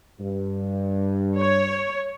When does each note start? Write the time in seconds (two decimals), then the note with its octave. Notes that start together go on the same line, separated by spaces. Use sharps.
0.20 G2
1.38 C#5